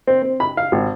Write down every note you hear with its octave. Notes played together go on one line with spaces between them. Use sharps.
C4
C4
B5
F5
G#1